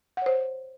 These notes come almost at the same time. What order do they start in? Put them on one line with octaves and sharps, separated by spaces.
F#5 C#5 C5